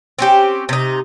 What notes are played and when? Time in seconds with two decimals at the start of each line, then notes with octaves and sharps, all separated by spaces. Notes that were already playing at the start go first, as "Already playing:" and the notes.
0.18 C4 C#4 G4
0.69 C3 D#4